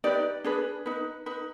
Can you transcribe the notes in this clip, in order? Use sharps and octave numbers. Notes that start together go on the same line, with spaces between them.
D#4 G4 B4 D5
D4 G#4 B4
D#4 B4
D#4 B4